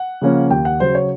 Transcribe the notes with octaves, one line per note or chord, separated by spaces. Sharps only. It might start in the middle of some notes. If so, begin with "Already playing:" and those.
Already playing: F#5
C#3 F3 A#3 C#4
D#2 G5
F#5
C#3 F#3 C5
C#5